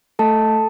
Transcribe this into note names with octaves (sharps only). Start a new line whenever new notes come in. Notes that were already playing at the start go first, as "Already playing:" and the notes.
A3 A4 A5